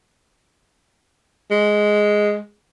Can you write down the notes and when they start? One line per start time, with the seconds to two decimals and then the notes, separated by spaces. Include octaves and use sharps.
1.51 G#3